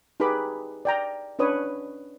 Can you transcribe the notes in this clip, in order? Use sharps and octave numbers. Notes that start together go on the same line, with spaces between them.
D#4 G4 G#4 B4 B5 D6
D5 G5 A#5
C#4 D4 B4 C#5 D#6